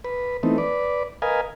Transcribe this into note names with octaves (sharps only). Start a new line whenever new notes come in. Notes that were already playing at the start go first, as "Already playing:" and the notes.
B4
E3 A3 B3 C4 D#4
B4 D5
A#4 B4 D#5 F5 G#5